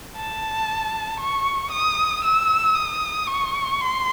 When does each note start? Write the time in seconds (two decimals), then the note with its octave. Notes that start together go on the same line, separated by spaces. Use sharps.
0.16 A5
1.20 C#6
1.71 D#6
2.25 E6
2.75 D#6
3.27 C#6
3.80 C6